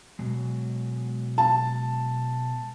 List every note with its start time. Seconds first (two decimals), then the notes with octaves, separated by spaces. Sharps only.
0.19 B2 F#3 G#3
1.38 A5